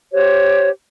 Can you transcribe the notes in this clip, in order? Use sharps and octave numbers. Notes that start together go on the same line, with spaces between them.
G4 C5 C#5